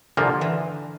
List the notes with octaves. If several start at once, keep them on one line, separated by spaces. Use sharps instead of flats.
C2 A#2 D3 F3 A#3
E3